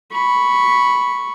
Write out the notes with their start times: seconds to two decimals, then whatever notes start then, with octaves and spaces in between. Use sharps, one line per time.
0.11 B5 C#6